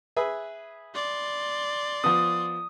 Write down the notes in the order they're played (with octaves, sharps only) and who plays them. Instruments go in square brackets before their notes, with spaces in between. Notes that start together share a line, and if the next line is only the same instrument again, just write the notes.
[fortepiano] G#4 B4 E5
[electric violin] D5 C6
[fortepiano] F3 B3 [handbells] D#6